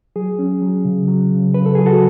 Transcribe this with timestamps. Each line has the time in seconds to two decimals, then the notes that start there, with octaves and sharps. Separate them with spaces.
0.16 F#3 G#4
0.39 C#4
0.62 F#3
0.85 C#3
1.08 F#3
1.31 C#3
1.54 C#3 B4
1.66 A4
1.75 F#3 G#4
1.86 F#4 A4